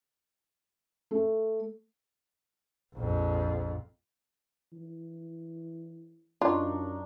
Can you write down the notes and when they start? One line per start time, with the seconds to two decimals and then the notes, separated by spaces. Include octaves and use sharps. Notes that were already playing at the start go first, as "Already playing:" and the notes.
1.11 A3
2.94 A#1 F2
4.72 E3
6.41 F#2 D4 D#4 F4 C#6